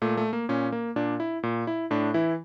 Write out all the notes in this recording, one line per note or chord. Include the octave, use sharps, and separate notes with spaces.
A#2 A3
A3
A#3
A#2 C#4
A#3
A#2 D4
E4
A#2
E4
A2 D4
E3 E4